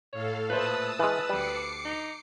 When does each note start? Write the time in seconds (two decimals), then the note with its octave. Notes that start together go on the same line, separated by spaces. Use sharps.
0.13 A2 A4 C#5 F5
0.50 A#2 A3 B4 C5 A5 D#6 E6
0.99 E3 G#3 B4 C#6 F6
1.29 D2 G3 G5 D6 C7 C#7
1.84 D#4